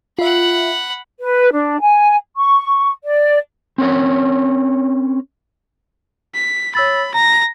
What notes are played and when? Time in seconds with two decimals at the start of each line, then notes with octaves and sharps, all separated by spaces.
0.19 F4 E5 F#5 B5
1.20 B4
1.52 D4
1.81 G#5
2.37 C#6
3.04 D5
3.78 C4 C#4 A#4 C#5
6.34 B6
6.75 C#5 B5 E6 A6
7.14 A#5 A#6